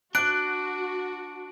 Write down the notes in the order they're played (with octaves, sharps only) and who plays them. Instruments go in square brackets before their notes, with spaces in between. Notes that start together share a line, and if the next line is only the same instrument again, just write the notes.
[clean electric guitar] D4 [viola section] F#4 [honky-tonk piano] F#6 [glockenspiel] D7